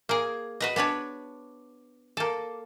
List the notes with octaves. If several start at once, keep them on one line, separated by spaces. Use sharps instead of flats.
A#3 G#4
F#4 B4 D#5
B3 D4 B4 C#5
A#3 A4